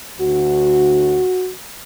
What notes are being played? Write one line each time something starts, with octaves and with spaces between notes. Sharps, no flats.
D2 D3 F#4